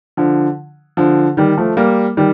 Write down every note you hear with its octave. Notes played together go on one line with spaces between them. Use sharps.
D3 F3
D3 F3
D#3 G3
F3 A3
G3 A#3
D#3 G3